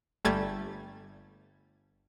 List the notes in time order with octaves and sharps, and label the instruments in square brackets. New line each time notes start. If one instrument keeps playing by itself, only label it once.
[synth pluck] G1 G3 A3 G#6 A6